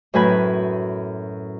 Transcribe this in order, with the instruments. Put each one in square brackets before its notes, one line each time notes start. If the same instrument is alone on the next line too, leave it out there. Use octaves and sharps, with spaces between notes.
[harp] F#2 A2 B4 G#5 B5